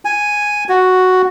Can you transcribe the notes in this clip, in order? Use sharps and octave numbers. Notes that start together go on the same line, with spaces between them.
G#5
F#4